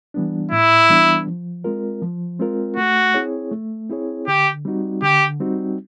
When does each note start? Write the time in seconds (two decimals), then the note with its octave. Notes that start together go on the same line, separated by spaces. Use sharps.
0.14 E3 G3 B3 D4
0.52 A2 E4
0.90 E3 G3 B3 D4
1.27 F3
1.64 G#3 C4 F4 A#4
2.02 F3
2.39 G#3 C4 F4 A#4
2.77 A3 F#4
3.14 C4 E4 G#4 C#5
3.52 A3
3.90 C4 E4 G#4 C#5
4.27 D3 G4
4.65 G3 C4 D#4 F#4
5.02 D3 G4
5.40 G3 C4 D#4 F#4